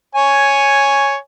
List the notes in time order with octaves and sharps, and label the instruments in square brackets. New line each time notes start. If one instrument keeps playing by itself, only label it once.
[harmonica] C#5 G#5